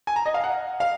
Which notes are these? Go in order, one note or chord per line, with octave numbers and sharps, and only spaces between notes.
G#5
A#5
D#5
F5
F#5
F5